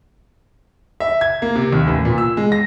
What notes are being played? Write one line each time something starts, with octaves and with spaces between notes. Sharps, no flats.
E5
G#6
A#3
C3
D#2
A1
A#2
E6
G#3
A#6